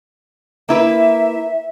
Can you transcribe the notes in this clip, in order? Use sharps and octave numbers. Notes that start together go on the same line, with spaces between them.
A#3 E4 B4 E5